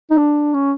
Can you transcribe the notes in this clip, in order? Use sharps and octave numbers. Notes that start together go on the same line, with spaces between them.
D#4
D4
C#4